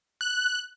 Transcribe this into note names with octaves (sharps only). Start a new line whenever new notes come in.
F#6